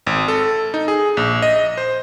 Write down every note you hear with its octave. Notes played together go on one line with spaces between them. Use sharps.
G#1
A4
D#4
G#4
A#1
D#5
C5